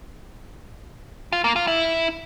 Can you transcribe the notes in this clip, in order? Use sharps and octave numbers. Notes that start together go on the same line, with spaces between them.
F4
A#3
F4
E4